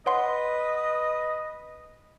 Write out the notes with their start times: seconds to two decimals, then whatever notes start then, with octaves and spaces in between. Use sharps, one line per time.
0.06 B4 C#5 D#5 F#5 C6